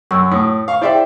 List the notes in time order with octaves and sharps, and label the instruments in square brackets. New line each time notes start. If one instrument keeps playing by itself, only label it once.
[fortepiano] F#2 [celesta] C#6 E6
[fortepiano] A2 [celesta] D#6
[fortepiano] F5 C#6
[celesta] E4 G#4 G5 [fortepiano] C5 D5 E5